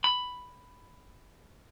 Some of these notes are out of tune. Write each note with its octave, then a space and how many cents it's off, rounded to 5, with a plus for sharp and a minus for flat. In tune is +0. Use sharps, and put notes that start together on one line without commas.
B5 +5